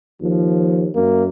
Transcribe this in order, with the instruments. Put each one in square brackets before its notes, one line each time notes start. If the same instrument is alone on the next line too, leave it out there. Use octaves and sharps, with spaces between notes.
[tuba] D#2 [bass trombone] F3
[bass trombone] F#2 [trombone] A#3